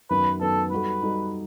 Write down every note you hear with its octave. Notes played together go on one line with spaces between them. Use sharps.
F#2 D#3 F#3 B3 B4
F#2 D#3 F#3 B3 A4
G3 D#4 F#4 A4 B4
G3 D#4 F#4 A4